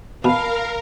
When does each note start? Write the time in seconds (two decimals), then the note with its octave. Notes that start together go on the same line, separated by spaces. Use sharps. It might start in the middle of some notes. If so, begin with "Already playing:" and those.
0.24 B2 A#4 F5 A5 B5